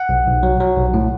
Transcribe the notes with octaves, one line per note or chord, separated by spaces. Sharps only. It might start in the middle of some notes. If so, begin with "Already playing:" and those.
Already playing: F#5
B1
B1
F#3
F#3
B1
A2